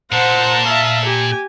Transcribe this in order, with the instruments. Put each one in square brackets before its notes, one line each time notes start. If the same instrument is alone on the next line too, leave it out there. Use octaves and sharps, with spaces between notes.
[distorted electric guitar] A#2 [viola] C5 F#5 [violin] A5 A#5
[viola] E5 F5
G4 G#5